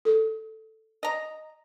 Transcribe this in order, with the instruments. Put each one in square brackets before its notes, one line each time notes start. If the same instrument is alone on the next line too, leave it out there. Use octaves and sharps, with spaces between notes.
[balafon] A4
[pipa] D#5 A#5